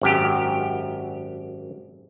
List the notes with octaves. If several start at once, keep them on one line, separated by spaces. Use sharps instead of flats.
G#1 F#2 G4